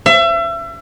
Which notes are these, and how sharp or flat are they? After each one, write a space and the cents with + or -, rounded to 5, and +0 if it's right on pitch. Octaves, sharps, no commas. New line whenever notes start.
E5 +35